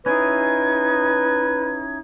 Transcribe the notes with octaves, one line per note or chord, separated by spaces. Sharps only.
C#4 D#4 E4 G#4 B4 G#6